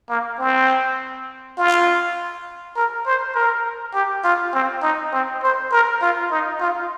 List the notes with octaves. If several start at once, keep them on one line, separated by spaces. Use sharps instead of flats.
A#3
C4
F4
A#4
C5
A#4
G4
F4
C4
D#4
C4
C5
A#4
F4
D#4
F4